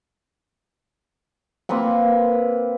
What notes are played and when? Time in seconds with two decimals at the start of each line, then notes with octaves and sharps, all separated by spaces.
1.69 A#3 C4 B4 F#5